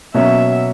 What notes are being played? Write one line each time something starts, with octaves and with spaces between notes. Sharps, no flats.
B2 F#3 A#3 C#4 E5